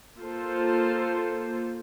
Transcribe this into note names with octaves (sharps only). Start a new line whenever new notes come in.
A#3 F4 A4 C5